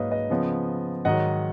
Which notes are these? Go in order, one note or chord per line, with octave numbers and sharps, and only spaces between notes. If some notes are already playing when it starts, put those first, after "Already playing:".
Already playing: G#2 F#3 A#3 D#4 B4 C#5 D#5 F5
B4 D#5
C#3 F3 B3
G#2 D#3 F#3 D#5 F#5